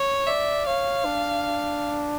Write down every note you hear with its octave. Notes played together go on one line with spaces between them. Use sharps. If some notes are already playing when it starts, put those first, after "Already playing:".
Already playing: C#5
D5 E5
C#5 F5
D4